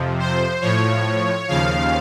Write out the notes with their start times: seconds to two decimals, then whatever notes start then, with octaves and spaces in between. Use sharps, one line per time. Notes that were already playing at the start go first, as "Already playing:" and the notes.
Already playing: F2 C3 F3
0.19 C5
0.61 A2 F3 C#5
1.48 D#2 C#3 F3 F5